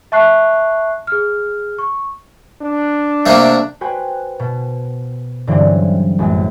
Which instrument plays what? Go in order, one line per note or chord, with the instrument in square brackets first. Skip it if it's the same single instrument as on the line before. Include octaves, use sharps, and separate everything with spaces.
[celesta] E5 A5 C#6 F#6 C7
G#4 F6
C#6
[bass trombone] D4
[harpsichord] C3 A3 A#3
[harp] F#4 B4 C5 G5 G#5
B2
G2 D3 E3 F#3 C4 C#4
A1 F#2 G#3